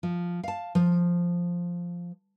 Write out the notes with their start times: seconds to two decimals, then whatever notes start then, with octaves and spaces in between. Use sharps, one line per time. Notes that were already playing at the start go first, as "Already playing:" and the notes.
0.03 F3
0.43 F5 A5
0.75 F3